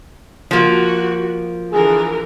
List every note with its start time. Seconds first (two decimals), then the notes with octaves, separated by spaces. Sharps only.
0.51 F3 A#3 F#4
1.73 D3 E3 G#4 A#4